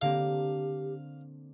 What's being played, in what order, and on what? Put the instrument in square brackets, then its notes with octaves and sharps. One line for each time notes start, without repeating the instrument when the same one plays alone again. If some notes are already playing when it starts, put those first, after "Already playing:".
[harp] D3 A#3 C4 [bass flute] G4 [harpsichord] F5